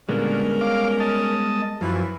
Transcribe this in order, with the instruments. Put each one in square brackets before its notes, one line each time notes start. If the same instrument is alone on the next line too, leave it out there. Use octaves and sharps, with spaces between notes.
[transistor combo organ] A#2 D3 [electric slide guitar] G3 G#3 B3 [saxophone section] C#4 A#4
[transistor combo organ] F5 D6
D#5 A5
[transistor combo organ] F#2 F3 [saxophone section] E3